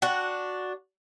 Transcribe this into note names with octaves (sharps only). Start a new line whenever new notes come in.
D4 F#4 F#5